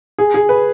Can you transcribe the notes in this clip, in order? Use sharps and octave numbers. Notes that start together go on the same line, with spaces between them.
G#4
G#4
B4